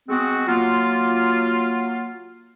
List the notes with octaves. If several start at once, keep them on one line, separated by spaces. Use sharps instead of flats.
G#3 B3 C4 F#4
F#3 A#3 F4